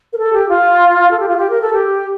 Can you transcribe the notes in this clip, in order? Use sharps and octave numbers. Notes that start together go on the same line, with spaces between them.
A#4
A4
G4
F4
A4
G4
F4
G4
A#4
A4
G4